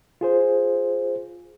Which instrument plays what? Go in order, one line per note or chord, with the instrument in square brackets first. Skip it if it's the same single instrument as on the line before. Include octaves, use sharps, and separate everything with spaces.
[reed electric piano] F4 G#4 C5